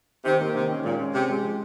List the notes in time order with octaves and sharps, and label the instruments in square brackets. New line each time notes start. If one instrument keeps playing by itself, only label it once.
[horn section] C3 [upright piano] D#3
[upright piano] A#3
[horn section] C3 [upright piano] D#3
[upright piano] C#4
[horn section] A#2 [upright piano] G#3
[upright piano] C#4
[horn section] C3 [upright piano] G#4
[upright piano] G#3
F3